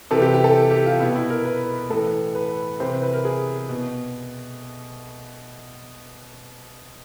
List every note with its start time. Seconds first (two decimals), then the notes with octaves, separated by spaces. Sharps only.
0.11 C3 E3 A4
0.22 G4
0.34 G4
0.44 A4
0.71 G4
0.86 F4
1.00 B2 E4
1.16 E4
1.30 A#4
1.45 B4
1.90 A2 E3 A4
2.35 B4
2.80 C3 E3 C5
3.02 B4
3.13 A#4
3.25 G#4
3.69 B2